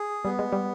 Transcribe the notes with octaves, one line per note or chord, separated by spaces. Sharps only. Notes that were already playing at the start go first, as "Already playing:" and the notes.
Already playing: G#4
G3 B3
G#3
G3